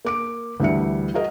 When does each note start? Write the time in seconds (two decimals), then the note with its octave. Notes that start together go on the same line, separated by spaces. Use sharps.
0.05 A#3 D6 D7
0.60 D2 E3 G3 E5 C#7
1.14 F#4 G#4 A#4 D#5